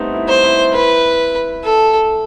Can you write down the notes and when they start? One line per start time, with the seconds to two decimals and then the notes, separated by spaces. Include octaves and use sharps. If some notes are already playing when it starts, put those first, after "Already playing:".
Already playing: G3 A3 B3 C4 D#4
0.13 E4
0.28 C5
0.44 E4
0.73 E4 B4
1.64 A4